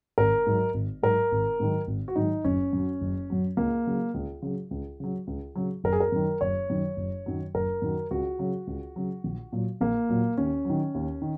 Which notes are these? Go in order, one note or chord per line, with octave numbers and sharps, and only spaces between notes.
G#1 A#4
G#2 F#3
G#1
G#2 F#3 A#4
G#1
G#2 D#3 F#3
G#1
F#4
G#2 D#3 F#3 D#4
F#1 C#4
F#2 F#3
F#1
F#2 F#3
C#2 A#3
C#3 F#3
C#2
C#3 F#3
C#2
C#3 F#3
C#2
C#3 F#3
F#1 A#4
G#4
A#4
F#2 D#3
F#1 C#5
F#2 D#3
F#1
F#2 D#3 F#3
F#1 A#4
F#2 D#3 F#3
C#2 F#4
C#3 F#3
C#2
C#3 F#3
A#1
A#2 F#3
A#1 A#3
A#2 F#3
D#2 C#4
D#3 F#3
D#2
D#3